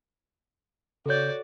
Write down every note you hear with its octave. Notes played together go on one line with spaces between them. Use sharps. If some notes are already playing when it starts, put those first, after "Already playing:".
C#3 F#4 A4 C#5 D5 G6